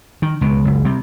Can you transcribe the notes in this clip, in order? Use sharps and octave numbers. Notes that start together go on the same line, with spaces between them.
D#3
C#2 B2
F#1 C#2
C3 G3